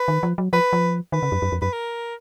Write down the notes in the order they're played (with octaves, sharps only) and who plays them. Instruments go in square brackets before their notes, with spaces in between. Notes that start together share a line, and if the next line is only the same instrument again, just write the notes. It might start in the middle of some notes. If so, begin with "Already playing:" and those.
Already playing: [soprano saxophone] B4
[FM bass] D#3
F3
F#3
[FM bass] F3 [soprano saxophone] B4
[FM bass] F3
[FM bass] D#3 [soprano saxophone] B4
[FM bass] C#3
F#2
F#2
F2
[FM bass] F#2 [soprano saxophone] B4
[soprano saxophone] A#4